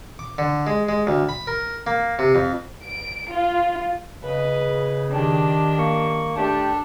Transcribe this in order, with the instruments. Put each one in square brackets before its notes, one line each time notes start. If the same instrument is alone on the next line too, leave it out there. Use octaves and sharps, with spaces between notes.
[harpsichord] D6
D3
G#3
G#3
D2
B5
A#4
A#3
C3
F2
[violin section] D7
F4
[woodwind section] C#3 [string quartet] B4 D#5
[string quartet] D#3 D4 G4
[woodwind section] A#3 C#6
[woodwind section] A3 G4 G5 [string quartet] D4 A4